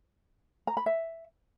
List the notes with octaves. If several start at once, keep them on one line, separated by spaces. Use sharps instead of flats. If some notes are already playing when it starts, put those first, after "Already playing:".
A#5
B5
E5